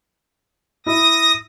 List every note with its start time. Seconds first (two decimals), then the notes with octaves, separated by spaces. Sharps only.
0.86 E4 D#6 A#6